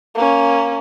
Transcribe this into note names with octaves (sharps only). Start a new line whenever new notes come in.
A#3 C#4